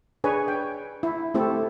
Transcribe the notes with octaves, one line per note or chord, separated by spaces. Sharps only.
D4 G#4 B4 C#5 G#5
G5
E4
A3 C4 E4 G4 A4